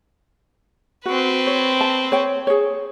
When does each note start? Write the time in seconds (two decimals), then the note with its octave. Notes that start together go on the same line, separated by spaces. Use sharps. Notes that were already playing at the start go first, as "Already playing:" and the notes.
1.06 C4 F#4 B4
1.47 C#5
1.81 A5
2.12 C#5 G5
2.47 G#4 C#5